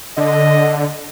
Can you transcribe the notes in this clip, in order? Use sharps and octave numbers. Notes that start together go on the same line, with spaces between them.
D3 D#5